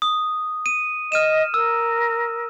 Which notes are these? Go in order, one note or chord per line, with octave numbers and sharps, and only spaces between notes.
D#6
D#7
D#5 F6 D#7 E7
A#4 E6